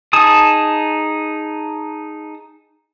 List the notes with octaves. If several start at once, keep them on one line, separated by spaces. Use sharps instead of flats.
D#4 G#4 A5 D#6